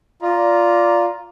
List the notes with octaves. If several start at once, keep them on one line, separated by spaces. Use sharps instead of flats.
F4 D5 A#5